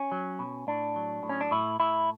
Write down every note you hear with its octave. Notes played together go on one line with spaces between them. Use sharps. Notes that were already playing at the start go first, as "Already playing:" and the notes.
Already playing: C#4
F#3
B2
A2 D4
F#3
A2
C#4
D4
A2 E4
A2 E4